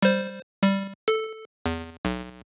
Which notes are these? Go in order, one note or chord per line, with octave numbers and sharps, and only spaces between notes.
G3 C5
G3
A4
E2
B1